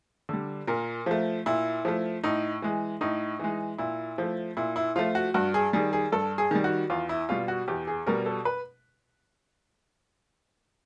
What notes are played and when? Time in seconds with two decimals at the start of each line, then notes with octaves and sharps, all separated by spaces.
0.29 D3 G3
0.67 A#2 A#4
1.06 F3 A3
1.46 A#2 E4
1.85 F3 A3
2.24 A2 D#4
2.62 E3 G#3
3.01 A2 D#4
3.40 E3 G#3
3.78 A#2 E4
4.18 F3 A3
4.57 A#2 E4
4.76 E4
4.96 F3 A3 F4
5.15 F#4
5.34 G2 F#4
5.54 G#4
5.73 D#3 G3 G#4
5.93 G#4
6.12 G2 A4
6.38 G#4
6.51 D#3 G3
6.64 F#4
6.90 E2 F4
7.09 E4
7.29 B2 G3 F4
7.48 F#4
7.68 E2 G4
7.87 G#4
8.07 B2 G3 A#4
8.26 A4
8.45 B4